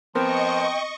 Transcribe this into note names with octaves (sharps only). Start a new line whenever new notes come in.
F3 B3 C4 A#4 D#5 G5 C#6